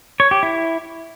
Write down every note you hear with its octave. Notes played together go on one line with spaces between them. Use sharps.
C#5
G4
E4